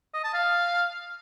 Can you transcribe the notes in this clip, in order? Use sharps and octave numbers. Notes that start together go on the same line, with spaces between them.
D#5
A5
F5